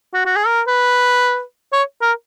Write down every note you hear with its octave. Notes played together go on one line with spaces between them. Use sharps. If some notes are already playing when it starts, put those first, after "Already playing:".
F#4
F#4
G#4
A#4
B4
C#5
A#4